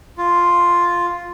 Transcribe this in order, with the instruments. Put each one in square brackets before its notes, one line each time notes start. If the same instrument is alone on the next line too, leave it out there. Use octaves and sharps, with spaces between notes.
[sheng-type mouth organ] F4